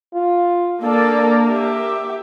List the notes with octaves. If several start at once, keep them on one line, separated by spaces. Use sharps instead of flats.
F4
A#3 D4 A4 D5
G4 E5